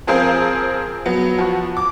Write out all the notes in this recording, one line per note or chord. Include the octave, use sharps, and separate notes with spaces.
F3 C4 G#4 A#4 C5 F5
F#3 B3
F3 F#4
D6